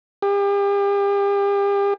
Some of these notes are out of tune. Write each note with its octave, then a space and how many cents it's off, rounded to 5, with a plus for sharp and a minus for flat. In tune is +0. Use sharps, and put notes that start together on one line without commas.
G4 +40